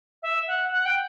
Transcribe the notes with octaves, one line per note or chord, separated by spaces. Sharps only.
E5
F#5
F#5
G5